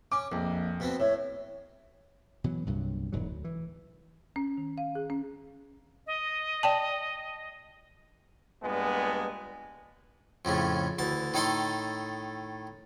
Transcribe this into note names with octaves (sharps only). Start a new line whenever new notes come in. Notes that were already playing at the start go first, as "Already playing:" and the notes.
C#4 D6
A#1 F2
B2 B3 C4
A2 C#5 E5
B2 E3 F#3
C2 G2 A#2 F#3
E1 G#2 C#3 F#3
D2
E3
C#4
D#3
F5
G#4
C#4
D#5
D5 G5 A5
G2 A#2 G#3 B3
F2 A2 C#3 A3
D2 E3 A5
A2 D#3 D#4 A4 A5 C6